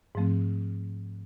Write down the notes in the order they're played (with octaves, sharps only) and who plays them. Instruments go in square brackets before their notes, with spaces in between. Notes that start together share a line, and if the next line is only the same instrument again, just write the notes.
[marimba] G#2 F3 A3 C4